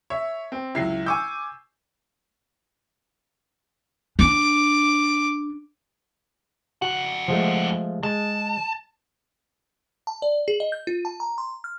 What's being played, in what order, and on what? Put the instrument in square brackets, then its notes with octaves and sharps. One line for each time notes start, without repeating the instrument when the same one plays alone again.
[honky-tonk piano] C#5 [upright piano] E5
[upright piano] C4
[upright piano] C#2 C7 [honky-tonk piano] F#3 E4
[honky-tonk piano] G#5 D6 G6 [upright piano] C#6 E6
[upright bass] D4 [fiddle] D6
[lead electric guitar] F2 F#5 [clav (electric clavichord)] F#4
[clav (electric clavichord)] F3 G#3 A3
[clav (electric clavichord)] G#3 [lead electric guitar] A5
[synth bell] A5
D5
G#4
D#5
G6
F4
A5
A#5
C6
F6